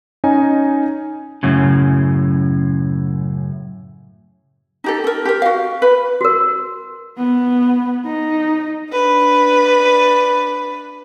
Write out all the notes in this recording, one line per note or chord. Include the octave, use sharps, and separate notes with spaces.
C#4 D#4 G#5
F#2 A2 C#3
D#4 G4 A4
A4 A#4
G4 A#4
F#4 F5
B4
F#4 A#4
B3
D#4
D4 B4